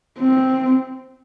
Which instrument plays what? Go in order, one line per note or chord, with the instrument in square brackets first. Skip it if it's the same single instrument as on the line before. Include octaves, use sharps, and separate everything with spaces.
[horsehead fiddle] C4